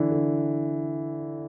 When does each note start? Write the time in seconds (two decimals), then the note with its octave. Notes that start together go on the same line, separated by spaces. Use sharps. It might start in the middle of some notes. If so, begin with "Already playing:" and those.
Already playing: D3 E3
0.12 D3